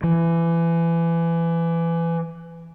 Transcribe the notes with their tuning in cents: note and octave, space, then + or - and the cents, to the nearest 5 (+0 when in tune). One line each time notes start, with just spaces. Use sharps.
E3 +25